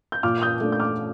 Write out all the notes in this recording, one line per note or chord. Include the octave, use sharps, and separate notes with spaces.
G6
A#2 D6 F6
D#6 G6
A3 D4
G6
D6 F6